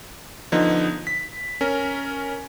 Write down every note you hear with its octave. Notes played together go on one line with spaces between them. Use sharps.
D3 F3 B3 D#4
B6
C#4 A#4